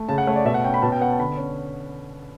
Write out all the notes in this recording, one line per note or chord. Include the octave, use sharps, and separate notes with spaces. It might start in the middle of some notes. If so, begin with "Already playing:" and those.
Already playing: A3
C#3 A5
F#5
A3 C#5
D5
B2 E5
F#5
C#4 G5
B5
B2 A5
G5
B3 F#5
A5
D3 B5
C#4